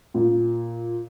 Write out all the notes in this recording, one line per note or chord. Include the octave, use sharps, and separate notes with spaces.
A#2